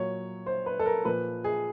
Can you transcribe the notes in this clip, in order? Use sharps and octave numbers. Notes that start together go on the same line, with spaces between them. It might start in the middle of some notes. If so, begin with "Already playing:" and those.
Already playing: A#2 F#3 C#5
C5
B4
A4
A#4
A#2 F3 B4
G#4